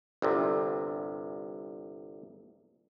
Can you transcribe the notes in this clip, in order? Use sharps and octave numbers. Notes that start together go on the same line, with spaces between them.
G1 C2 C3